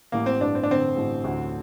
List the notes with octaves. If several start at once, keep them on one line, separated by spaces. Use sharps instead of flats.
A1 A#3
C4
G2 D4
C4
D4
D3 C4
A1
D2